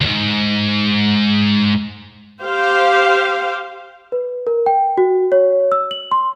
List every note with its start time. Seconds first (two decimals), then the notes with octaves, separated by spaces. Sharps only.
0.01 D2 G#2
2.42 G4 C5 F5
4.12 B4
4.47 A#4
4.66 G5
4.98 F#4
5.32 C#5
5.72 E6
5.91 F#7
6.11 C6